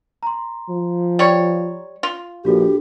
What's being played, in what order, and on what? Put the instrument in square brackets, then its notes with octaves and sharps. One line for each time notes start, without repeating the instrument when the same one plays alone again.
[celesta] A#5 C6
[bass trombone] F3
[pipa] G3 C#5
F4
[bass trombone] A#1 [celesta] D4 F#4 A4 [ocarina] G4